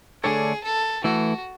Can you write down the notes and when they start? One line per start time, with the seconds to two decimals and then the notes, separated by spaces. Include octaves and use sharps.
0.24 D3 A3 D4 G#4 A4 C#5
0.64 A4
1.04 E3 A3 E4 F#4